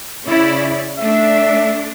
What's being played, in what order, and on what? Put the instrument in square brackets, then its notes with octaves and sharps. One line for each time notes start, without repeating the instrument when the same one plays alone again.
[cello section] C#3 E4 D5
[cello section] A3 D4 [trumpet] E5